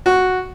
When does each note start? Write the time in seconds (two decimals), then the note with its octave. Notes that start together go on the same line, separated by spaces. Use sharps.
0.06 F#4